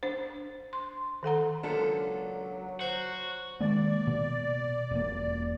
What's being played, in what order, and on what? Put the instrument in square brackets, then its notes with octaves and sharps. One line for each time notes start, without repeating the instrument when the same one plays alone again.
[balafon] D4 C5
C6
D#3 A4 F#5 A#5
[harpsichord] C#2 A#2 [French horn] F#3 [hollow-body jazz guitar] D4 A4
[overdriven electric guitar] F#4 [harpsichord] C5
[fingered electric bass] D#3 G#3 A#3 [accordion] D5
[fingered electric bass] B2
E1 A#3